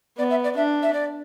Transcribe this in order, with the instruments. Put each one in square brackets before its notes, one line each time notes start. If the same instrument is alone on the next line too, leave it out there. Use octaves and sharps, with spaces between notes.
[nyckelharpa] B3 [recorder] D5
[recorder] E5
D5
[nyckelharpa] D4 [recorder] E5
[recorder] E5
D5